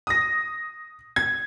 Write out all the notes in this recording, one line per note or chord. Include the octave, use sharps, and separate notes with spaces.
D#6 A#6
G#6